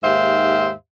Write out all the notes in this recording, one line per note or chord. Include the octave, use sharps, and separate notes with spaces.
D#2 G#2 G4 C5 E5 F5